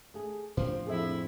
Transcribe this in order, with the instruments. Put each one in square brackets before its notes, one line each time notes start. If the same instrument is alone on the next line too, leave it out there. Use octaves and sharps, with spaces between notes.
[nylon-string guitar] A3 G#4
[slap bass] A2 D4 [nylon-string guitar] F3 F4 G4 [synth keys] C5
[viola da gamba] F2 E4 [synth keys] G#4 A4 E5